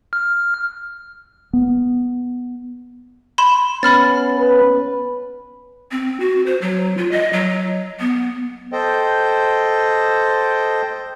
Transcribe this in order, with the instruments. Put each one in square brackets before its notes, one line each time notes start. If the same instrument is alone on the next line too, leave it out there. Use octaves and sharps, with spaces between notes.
[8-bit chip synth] F6
[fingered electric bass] B3
[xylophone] B5 C6 E7
[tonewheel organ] B3 C#4 [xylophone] B5 F6 A6
[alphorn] B4
[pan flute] C4
F#4
C5
F#3
F4
D#5
F#3
B3
[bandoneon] A4 C5 D#5 G5